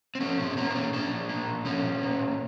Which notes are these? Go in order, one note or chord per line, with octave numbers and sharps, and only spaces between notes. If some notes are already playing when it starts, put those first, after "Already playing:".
C4
F3 C#4
A#2 C4
A#3 C#4
D4
A#2 C#4
F3 D4
A#2
A#3
A#2
F3 C#4
A#2
A#3
A#2